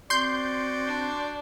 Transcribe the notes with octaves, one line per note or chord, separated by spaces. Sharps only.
C4 F#4 D5 C6 G6
D4